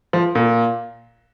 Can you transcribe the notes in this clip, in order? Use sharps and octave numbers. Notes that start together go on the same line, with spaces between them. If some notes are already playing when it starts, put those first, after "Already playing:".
F3
A#2